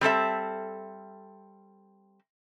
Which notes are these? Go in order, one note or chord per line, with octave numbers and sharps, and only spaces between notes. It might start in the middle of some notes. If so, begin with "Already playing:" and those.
G3 C4 A4 E5